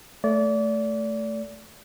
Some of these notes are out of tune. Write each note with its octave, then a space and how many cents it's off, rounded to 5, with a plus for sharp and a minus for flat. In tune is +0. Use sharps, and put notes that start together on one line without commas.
A3 +0 D5 -30